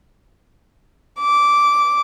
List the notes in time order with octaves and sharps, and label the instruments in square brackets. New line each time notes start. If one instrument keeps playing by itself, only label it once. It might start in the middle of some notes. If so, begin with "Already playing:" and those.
[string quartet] D6